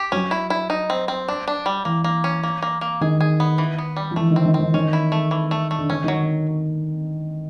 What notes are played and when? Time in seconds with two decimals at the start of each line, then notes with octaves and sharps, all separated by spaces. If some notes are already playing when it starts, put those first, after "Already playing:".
Already playing: G4
0.12 F#3 C#4
0.31 E4
0.50 E4
0.70 D#4
0.90 C4
1.08 C4
1.28 D4
1.48 D4
1.66 G3
1.85 E3 A#3
2.04 A#3
2.24 C#4
2.43 A#3
2.62 A#3
2.81 A#3
3.01 D#3 G#4
3.21 G#4
3.40 B3
3.58 E3
3.78 B3
3.96 G3
4.11 F3
4.16 E3 A3
4.31 D#3
4.36 C4
4.46 D#3
4.54 C4
4.60 D#3
4.74 D#3 C#4
4.93 E4
5.12 A3
5.31 E3
5.51 A3
5.71 A3
5.79 D3
5.90 D#3 C#4
6.04 D#3
6.08 F#3